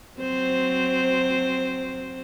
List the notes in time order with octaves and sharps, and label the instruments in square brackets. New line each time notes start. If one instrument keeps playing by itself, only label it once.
[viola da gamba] F#3 C4 C5